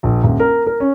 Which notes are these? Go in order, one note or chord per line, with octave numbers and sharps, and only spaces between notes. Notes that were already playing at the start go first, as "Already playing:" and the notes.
A#1
D#1
A#4
A#4
C#4